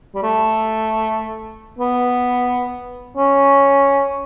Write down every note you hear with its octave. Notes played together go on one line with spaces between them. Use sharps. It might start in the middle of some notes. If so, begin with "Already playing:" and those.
G3
A3
B3
C#4